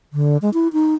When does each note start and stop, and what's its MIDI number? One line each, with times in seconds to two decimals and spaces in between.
0.13 0.37 50
0.42 0.50 56
0.54 0.68 64
0.73 0.95 63